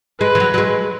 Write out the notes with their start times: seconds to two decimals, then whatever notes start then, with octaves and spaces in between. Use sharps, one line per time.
0.21 G#3 B4
0.35 E3
0.40 F#3
0.54 F#3
0.58 G#3